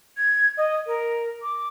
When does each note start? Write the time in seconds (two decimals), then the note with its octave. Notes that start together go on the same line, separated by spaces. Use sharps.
0.17 G#6
0.58 D#5
0.87 A#4
1.43 D6